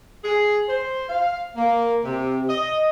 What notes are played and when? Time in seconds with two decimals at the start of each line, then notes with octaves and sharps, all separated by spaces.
0.24 G#4
0.68 C5
1.09 F5
1.56 A#3
2.04 C3
2.49 D#5